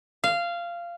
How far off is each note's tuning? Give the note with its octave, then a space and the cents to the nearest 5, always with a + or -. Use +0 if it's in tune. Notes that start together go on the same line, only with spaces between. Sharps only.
F5 -15